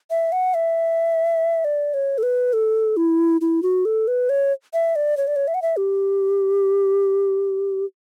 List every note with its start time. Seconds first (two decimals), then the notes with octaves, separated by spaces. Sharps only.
0.10 E5
0.32 F#5
0.54 E5
1.65 D5
1.94 C#5
2.18 A4
2.23 B4
2.53 A4
2.97 E4
3.41 E4
3.63 F#4
3.85 A4
4.08 B4
4.29 C#5
4.73 E5
4.96 D5
5.17 C#5
5.27 D5
5.36 C#5
5.48 E5
5.54 F#5
5.62 E5
5.77 G4